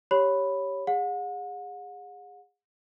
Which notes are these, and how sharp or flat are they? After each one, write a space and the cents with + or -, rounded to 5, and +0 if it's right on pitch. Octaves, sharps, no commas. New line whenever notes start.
G4 -5 C#5 +0 B5 +0
G#4 -25 F#5 -40